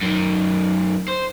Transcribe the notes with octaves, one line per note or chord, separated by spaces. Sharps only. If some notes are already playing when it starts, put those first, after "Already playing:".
F#2 D#3
C5